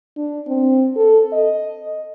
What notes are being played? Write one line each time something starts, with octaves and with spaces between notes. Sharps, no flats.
D4
C4
A4
D#5